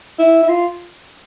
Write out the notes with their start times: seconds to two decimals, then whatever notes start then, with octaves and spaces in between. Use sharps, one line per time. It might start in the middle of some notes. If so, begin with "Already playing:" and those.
0.19 E4
0.43 E4
0.49 F4